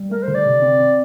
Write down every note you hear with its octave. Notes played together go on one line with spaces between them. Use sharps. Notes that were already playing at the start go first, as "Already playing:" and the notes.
Already playing: G3
A3 A#4
C5
D3
D5
C3
C4
C4